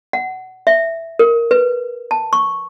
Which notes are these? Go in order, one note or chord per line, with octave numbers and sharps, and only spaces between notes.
F#5
E5
A#4
B4
A5
C#6